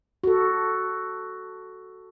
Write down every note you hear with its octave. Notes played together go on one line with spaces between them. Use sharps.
F#4 A4